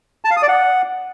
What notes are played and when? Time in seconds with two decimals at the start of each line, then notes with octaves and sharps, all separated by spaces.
0.25 A5
0.31 F5
0.36 D#6
0.42 D5
0.48 F#5